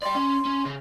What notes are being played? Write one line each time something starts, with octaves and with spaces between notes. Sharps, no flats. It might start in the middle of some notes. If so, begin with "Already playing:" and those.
D5 G5 C6
C#4
C#4
C#3